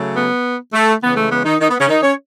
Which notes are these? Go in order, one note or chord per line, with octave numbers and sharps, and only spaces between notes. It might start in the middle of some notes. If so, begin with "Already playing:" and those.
Already playing: C#3 F#3 A3
B3
A3
C#3 E3 G#3 B3
A3
B3
D#3 D#4
D#3 D#4
B3
C#3 C#4
D#3 D#4
C#4 C#5